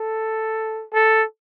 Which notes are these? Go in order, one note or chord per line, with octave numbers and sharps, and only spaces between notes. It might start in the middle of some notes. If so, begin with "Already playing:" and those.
Already playing: A4
A4